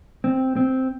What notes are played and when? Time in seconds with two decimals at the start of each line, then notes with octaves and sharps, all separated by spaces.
0.24 C4
0.56 C4